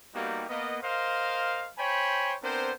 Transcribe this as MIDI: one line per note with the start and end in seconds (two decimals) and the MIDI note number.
0.15 0.44 55
0.15 0.44 58
0.15 0.44 59
0.15 0.44 63
0.15 0.44 66
0.15 0.44 67
0.49 0.78 58
0.49 0.78 59
0.49 0.78 75
0.83 1.69 70
0.83 1.69 72
0.83 1.69 75
0.83 1.69 77
1.78 2.35 72
1.78 2.35 73
1.78 2.35 79
1.78 2.35 80
1.78 2.35 83
2.43 2.72 59
2.43 2.72 60
2.43 2.72 62
2.43 2.72 70
2.43 2.72 72